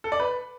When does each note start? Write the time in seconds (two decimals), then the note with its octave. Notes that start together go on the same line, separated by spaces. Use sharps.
0.04 A4
0.12 D5
0.20 B4